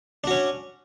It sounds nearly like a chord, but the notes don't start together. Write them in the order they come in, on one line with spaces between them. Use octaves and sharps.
D4 F#4 C#4